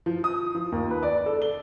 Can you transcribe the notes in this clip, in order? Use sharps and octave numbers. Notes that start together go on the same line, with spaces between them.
F3
D#6
F3
D#2
B4
D5
A4
G7